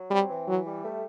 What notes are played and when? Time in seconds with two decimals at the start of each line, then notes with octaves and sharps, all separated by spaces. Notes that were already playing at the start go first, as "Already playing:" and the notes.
Already playing: F#3
0.11 G3 C4
0.29 E3
0.47 E3 F#3
0.66 G3
0.84 A3